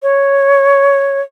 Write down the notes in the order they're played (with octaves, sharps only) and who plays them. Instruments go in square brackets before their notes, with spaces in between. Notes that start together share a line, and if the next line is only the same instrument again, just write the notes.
[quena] C#5